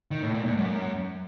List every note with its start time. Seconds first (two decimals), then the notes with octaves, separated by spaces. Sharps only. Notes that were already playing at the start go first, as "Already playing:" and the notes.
0.11 D#3
0.23 A2
0.34 A#2
0.46 G#2
0.57 F#2